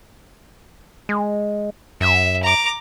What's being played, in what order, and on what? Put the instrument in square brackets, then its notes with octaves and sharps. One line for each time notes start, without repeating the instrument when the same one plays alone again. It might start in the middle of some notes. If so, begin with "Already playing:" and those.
[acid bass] G#3
[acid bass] F#2 [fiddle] E5
[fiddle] A#5 D6